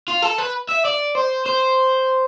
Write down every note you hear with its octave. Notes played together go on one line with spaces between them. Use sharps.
F4
A4
B4
E5
D5
C5
C5